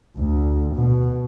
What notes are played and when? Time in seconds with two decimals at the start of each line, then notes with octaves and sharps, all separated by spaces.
0.16 D2
0.76 B2